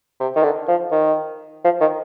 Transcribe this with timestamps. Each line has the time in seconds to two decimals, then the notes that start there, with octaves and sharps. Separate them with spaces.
0.20 C3
0.36 D#3
0.43 D3
0.68 F3
0.92 D#3
1.64 F3
1.81 D#3